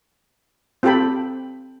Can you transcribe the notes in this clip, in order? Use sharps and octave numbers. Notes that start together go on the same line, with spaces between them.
C4 F4 G4 A4 G5 B5